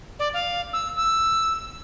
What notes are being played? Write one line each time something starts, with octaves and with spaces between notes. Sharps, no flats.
D5
F5
E6
E6